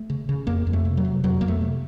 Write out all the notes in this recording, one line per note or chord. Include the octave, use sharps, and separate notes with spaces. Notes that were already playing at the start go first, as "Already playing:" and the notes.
Already playing: A3
C#3
C#3
F2 A#3
F2
A3
C3
F#3
C3
F2 F#3
F2 A#3
A3
C3